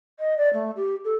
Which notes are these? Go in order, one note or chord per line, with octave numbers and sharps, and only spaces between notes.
D#5
D5
A3
G4
A4